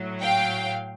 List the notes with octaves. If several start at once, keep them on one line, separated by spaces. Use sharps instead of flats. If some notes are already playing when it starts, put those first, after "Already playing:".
Already playing: A2 F#3
F5 G5